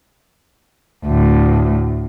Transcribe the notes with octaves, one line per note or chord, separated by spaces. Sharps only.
D2 A2